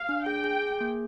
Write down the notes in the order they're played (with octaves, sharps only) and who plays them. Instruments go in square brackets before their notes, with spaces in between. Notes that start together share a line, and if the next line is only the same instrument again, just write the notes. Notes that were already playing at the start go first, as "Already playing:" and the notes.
Already playing: [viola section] F5
[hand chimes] D4
[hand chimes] G#4 [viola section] G5
[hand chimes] G#4
G#4
A#3